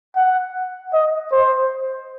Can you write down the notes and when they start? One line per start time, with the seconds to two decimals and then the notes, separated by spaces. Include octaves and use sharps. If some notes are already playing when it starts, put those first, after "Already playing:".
0.16 F#5
0.93 D#5
1.32 C5